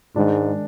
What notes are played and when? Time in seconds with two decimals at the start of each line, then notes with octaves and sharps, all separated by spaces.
0.16 G#2 D#3 G#3 D4